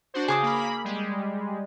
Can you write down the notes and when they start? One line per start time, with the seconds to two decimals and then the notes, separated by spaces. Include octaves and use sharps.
0.14 D4 F#4 C5
0.28 C#3 G#4 D6 D#6
0.43 A#3 B5
0.85 G3 G#3